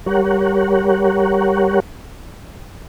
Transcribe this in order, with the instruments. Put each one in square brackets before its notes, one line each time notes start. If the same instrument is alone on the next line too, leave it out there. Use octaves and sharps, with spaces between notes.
[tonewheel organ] G3 G4 A#4 C#5 F#5